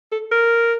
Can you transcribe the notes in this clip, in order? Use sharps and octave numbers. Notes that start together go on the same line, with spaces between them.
A4
A#4